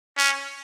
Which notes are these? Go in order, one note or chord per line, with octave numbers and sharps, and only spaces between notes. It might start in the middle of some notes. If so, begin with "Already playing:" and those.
C#4